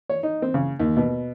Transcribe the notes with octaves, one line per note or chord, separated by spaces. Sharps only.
C#5
D#4
C4
C#3
D#2
B2